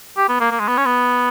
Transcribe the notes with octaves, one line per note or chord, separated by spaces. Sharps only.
G4
B3
A#3
A#3
G#3
B3
C#4
B3